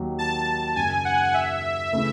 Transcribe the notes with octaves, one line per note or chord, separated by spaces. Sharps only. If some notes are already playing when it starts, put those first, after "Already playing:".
Already playing: D#2 D#3 F#3
A5
F#2 C#3 G#3 G#5
F#5
E5
C#3 E3 A3 E4